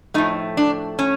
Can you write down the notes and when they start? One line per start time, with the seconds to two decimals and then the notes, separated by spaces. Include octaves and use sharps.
0.14 A2 F3 A3 D#4
0.57 D4
0.99 C#4